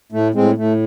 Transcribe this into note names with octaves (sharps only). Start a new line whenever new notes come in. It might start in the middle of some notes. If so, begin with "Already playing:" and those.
A2 A3
A2 G#3 C4
A2 A3